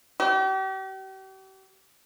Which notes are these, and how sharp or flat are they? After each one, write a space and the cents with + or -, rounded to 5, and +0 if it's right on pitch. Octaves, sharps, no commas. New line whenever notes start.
G4 -40